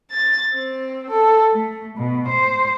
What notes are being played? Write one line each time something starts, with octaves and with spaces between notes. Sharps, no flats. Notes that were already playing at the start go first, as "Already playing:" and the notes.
A6
C4
A4
A3
B2
C5